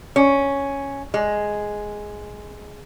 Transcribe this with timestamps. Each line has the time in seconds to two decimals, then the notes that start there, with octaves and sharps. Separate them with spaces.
0.16 C#4
1.14 G#3